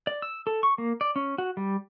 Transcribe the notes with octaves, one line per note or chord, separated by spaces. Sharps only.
D5
E6
A4
C#6
A#3
D5
C#4
F#4
G3